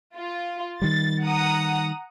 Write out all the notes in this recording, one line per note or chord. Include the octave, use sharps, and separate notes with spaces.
F4
D#3 G3 A6
F#5 A#5 D#6